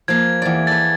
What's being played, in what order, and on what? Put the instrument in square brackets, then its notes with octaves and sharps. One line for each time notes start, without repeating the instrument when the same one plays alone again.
[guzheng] F3 A#3 [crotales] G#6
[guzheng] E2 D5
[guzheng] A4 B4 [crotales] A6